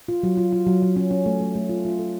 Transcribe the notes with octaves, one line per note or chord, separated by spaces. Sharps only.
F4
F#3
F4
F4
F#3
F#3
C#4
C#4
A3
A3
A3
F4
F4
A4